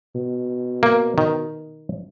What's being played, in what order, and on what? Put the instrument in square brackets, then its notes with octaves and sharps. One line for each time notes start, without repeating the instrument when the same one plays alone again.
[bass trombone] B2
[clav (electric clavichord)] A#3
D#3